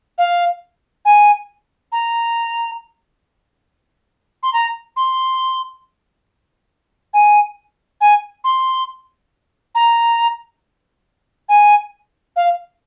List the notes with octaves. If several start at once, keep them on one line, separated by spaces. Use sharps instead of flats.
F5
G#5
A#5
C6
A#5
C6
G#5
G#5
C6
A#5
G#5
F5